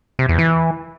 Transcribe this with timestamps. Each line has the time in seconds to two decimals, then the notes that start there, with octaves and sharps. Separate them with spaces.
0.19 C3
0.29 E2
0.38 E3